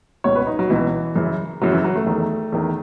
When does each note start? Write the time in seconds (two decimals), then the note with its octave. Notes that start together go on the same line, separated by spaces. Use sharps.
0.24 C#2 B2 C#5
0.36 B4
0.47 D#4
0.59 F#3
0.70 C#2 B2 E3
1.16 F#2 C#3 E3
1.61 F#2 C#3 E3 F#3
1.73 E3
1.84 F#3
1.96 A3
2.06 E2 D#3
2.52 E2 D#3